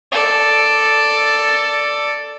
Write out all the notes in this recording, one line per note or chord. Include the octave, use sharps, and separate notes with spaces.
A4 D5